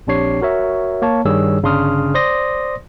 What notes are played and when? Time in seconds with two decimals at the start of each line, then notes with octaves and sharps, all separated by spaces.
0.07 A#1 C4 D4 G4 C#5 C7
0.41 F#4 A#4 C#5 E5
1.02 A#3 C#5 A5
1.25 G2 D#3 G3 G#4 C#5 E6
1.63 G1 C#3 D4 C6 D#6 F6
2.14 C5 D5 C6 D#6 A#6